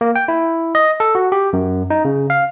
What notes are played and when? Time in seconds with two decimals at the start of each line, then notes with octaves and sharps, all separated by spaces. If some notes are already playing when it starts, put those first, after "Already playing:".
0.01 A#3
0.16 G5
0.28 E4
0.75 D#5
1.00 A4
1.15 F#4
1.32 G4
1.53 F#2
1.90 D#4
2.05 C#3
2.30 F5